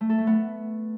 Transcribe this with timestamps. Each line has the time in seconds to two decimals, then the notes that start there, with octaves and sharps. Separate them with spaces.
0.01 A3
0.09 A4
0.18 A3
0.27 B3